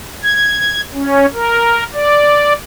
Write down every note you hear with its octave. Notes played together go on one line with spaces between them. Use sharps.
G#6
C#4
A#4
D5